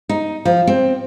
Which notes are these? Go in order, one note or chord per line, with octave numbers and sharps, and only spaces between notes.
D#4
F3
C4